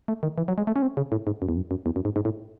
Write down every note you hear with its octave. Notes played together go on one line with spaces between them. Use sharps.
A3
D#3
E3
F#3
G#3
A3
C#4
C4
C#3
A2
G#2
F#2
E2
F#2
F#2
E2
F#2
G#2
G#2
A2